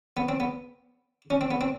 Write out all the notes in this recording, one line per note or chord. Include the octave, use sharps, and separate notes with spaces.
B3
C4
B3
C#4
C4
B3
C4